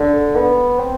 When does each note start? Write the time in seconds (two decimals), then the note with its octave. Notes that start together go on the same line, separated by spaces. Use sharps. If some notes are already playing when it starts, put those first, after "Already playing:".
Already playing: D3
0.36 B3
0.79 C4